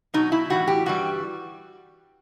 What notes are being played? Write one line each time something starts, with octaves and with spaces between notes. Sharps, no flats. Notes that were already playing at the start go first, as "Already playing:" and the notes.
B2 F#3 D#4
E4
A2 E3 G3 F#4
G4
G2 E3 G3 F#4